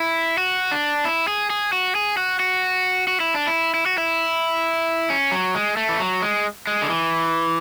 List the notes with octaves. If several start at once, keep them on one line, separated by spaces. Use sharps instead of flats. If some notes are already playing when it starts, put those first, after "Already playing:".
Already playing: E4
F#4
D4
E4
G#4
G#4
F#4
G#4
F#4
F#4
F#4
E4
D4
E4
E4
F#4
E4
C#4
F#3
G#3
A3
E3
F#3
G#3
G#3
D3
E3